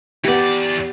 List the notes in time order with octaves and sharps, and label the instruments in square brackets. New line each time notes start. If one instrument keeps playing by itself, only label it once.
[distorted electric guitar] E3 D5 [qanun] B3 G4